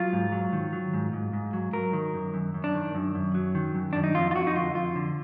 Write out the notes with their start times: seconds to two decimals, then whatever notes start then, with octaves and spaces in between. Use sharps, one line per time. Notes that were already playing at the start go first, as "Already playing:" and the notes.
Already playing: F#3 F4
0.13 G#2
0.32 F#3
0.53 D#3
0.73 F#3
0.93 G#2
1.13 G#2
1.33 G#2
1.53 F#3
1.73 F#3 A#4
1.93 D#3
2.14 F#2
2.34 F#2
2.54 F#2
2.64 D4
2.75 D#3
2.95 F#2
3.15 F#2
3.35 F#3
3.55 D#3
3.75 F#2
3.93 F#2 D4
4.04 D#4
4.14 F2 F4
4.31 F4
4.35 F2 F#4
4.47 D#4
4.55 D3 F4
4.75 F2 F4
4.96 D3